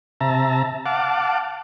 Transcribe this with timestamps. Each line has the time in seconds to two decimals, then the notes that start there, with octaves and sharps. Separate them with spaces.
0.21 C3 E5 A5 A#5
0.86 F5 F#5 A5 D6